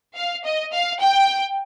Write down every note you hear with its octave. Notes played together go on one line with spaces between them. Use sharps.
F5
D#5
F5
G5